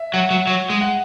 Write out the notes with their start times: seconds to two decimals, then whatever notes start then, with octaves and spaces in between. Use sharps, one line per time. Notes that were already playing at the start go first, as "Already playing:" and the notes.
Already playing: E5
0.14 F#3 F#5
0.30 F#3
0.47 F#3
0.70 G#3
0.81 F#5